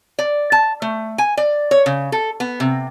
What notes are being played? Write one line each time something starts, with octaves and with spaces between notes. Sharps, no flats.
D5
A5
A3
G#5
D5
C#5
C#3
A4
B3
C3